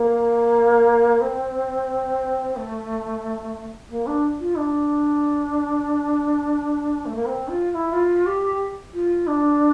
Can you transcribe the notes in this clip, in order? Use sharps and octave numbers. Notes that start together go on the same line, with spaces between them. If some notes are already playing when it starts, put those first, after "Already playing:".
Already playing: A#3
C4
A3
A#3
D4
F4
D4
A3
A#3
C4
F4
F4
E4
F4
G4
F4
D4